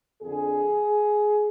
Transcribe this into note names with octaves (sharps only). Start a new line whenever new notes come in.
F2 D3 G#4